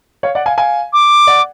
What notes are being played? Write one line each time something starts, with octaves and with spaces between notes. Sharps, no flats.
C#5 F5
D5 F#5
F5 G#5
F5 G#5
D6
D5 F#5